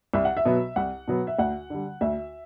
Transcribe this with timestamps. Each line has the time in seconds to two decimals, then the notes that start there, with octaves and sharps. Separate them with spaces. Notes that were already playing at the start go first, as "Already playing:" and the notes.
0.14 C2 E5
0.25 F#5
0.37 E5
0.45 B2 F#3 B3
0.76 C2 F#5
1.07 B2 F#3 B3
1.27 E5
1.39 D2 F#5
1.70 D3 G3
2.01 D2 E5